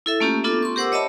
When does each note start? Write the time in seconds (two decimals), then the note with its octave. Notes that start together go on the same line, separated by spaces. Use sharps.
0.06 E4 A4 E5
0.20 A3 A#3 C#4 F4 G4
0.44 B3 D4 F4 A4
0.62 C6 C#6
0.76 G4 A#4 C5 F#5 D6 E6
0.92 C#5 D#5 E5 A5 B5